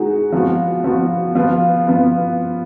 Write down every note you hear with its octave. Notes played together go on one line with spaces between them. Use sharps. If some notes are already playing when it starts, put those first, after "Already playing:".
Already playing: G#3 D#4 F#4
F3 B3 F#4
F3 B3 F#4
F3 B3 F4 B4
F3 B3 F4 B4